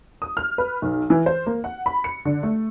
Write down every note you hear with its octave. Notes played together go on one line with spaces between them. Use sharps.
D#6
F6
B4
B1
E3
C5
A#3
F#5
B5
C#7
D3
A3